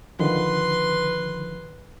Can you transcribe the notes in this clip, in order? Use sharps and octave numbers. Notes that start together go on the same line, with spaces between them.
D3 D#3 F3 B4 C6